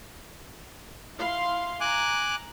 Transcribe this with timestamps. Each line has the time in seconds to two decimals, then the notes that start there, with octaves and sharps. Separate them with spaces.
1.16 E4 F5 C6
1.80 G#5 A#5 D6 F#6